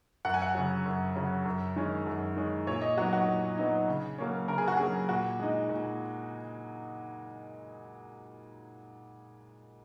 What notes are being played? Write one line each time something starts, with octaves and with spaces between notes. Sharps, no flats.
F#2 F#5
G#5
F#5
C#3 F#3
F#2
C#3 F#3
F#2
D#3 G#3 C#4
F#2
D#3 G#3 C#4
A#2 C#5
D#5
F#3 B3 D#4 F#4
F#4
A#2
F#3 B3 D#4
C#3
F#3 A#3 C#4
C#3 A#4
G#4
F#4
F#3 A#3 C#4 G#4
A#2 F#4
G#3 D#4
A#2